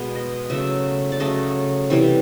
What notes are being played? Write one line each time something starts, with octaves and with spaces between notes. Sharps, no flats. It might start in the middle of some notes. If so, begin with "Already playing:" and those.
Already playing: B2 G#3 B3
D#5
C#3 F#3 A3 E5
D5
C#3 F#3 A3 D#5
C3 E3 G3